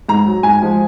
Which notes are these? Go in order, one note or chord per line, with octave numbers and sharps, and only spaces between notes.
G#2 A#5
F#3
G#2 G#5
F3 G#3